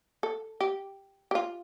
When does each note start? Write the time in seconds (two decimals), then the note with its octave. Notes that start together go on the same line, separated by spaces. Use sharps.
0.23 A4
0.61 G4
1.31 G4
1.35 F4